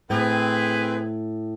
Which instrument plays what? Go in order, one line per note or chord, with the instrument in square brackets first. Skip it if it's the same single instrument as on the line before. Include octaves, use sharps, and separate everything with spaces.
[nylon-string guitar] A2 [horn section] C4 G#4 B4